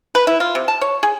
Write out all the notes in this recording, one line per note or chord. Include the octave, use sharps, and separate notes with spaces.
B4
E4
F4
C3
A5
C#5
G#4